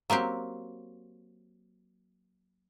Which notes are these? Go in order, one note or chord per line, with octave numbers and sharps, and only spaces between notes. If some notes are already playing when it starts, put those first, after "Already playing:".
F#3 A#3 C4 G4